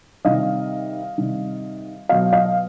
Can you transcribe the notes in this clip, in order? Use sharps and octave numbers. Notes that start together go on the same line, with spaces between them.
C3 D#3 G3 D#5 F5
C3 D#3 G3
B2 F#3 D#5 F5
D#5 F5